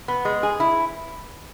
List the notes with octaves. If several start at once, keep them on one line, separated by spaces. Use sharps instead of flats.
B3
G#3
G#4
E4